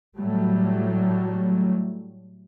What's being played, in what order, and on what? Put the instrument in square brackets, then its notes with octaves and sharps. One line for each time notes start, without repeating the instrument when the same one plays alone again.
[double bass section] A2 F#3 G3 A3